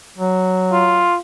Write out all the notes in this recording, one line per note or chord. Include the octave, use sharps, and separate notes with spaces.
F#3
F4